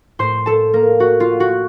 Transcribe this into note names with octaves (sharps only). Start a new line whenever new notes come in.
A2 C5 C6
A4 A5
A#3 A#4
F#4
F4
F#4